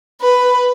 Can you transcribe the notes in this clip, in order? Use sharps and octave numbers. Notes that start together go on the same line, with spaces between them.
B4